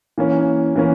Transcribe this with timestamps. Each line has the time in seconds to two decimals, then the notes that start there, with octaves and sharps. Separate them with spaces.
0.18 E3 A#3 C#4
0.76 E3 A#3 C#4